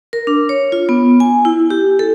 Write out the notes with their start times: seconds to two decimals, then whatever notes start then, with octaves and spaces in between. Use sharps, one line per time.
0.13 A#4
0.27 D4
0.49 C#5
0.72 F4
0.89 B3
1.20 G#5
1.45 E4
1.70 G4
1.99 A4